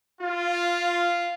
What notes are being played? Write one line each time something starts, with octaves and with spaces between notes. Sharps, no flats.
F4